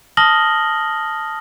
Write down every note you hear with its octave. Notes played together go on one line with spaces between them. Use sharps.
A5 D#6 F6 A#6 F#7 G7